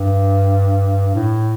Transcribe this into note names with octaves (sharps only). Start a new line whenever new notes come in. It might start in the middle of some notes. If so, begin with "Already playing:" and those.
Already playing: G2
A2